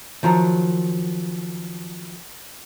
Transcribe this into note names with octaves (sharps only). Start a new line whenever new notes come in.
D#3 F3 F#3 A#5